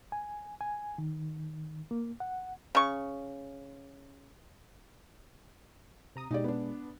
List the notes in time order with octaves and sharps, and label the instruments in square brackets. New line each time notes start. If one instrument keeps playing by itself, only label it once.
[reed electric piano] G#5
G#5
D#3
A#3
F#5
[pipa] C#3 C#6
[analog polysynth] C3 A#5 D#6
[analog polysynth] B2 G#3 [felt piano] D#4 G4 D5
[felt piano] B3 D4